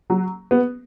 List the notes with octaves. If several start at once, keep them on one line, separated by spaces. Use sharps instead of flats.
F#3
B3